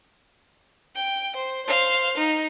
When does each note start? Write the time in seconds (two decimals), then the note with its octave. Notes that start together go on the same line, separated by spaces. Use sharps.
0.95 G5
1.36 C5
1.66 C5 F5
2.17 D#4